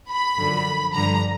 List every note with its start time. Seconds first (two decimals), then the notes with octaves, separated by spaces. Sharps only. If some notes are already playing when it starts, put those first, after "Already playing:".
0.09 B5
0.38 F#2 D3 F3
0.93 G2 D3 F3 A#5